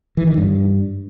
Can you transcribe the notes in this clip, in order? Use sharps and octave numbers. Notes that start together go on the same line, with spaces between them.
E3
D#3
G2